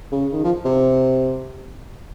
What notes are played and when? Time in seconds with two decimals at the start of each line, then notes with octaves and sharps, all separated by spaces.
0.12 C#3
0.32 D#3
0.44 F3
0.65 C3